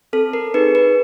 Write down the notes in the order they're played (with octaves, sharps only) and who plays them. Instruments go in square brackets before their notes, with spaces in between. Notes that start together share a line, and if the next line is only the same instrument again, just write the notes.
[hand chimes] C4 A4
A#4
D#4 G#4 B4
B4